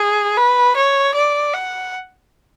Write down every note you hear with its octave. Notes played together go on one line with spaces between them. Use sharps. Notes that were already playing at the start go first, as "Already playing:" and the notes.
Already playing: G#4
B4
C#5
D5
F#5